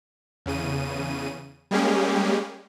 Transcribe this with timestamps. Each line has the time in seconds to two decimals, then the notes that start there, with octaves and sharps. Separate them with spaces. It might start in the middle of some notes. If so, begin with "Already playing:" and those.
0.46 E2 C#3 D#7
1.71 G3 G#3 A#3 C#4 G4 G#4